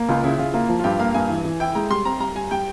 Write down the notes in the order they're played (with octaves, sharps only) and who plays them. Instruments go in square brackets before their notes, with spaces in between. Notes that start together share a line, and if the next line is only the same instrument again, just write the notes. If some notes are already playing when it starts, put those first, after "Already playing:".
Already playing: [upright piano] A#3
[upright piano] C#2 [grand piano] F4
[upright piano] C#3 [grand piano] E4
[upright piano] C#3 [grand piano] F4
[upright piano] A#3 [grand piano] F4
[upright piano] F3
[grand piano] F4
[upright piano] G2 [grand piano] G4
[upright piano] A#3 [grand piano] F5
[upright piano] G2 [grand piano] G#5
[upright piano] E3
E3
[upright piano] E4 [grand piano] G5
[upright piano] G#3 [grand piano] A#5
[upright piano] G3 [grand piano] C6
[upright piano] C4 [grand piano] A#5
[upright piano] G3 [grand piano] A#5
[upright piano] G3 [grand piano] G#5
[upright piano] G3 [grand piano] G5